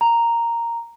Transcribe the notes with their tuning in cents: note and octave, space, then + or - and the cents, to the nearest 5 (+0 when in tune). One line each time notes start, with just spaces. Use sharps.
A#5 -5